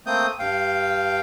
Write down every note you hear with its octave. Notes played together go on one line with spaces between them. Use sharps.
A3 A#3 C4 D#6 G6
G2 F5 G5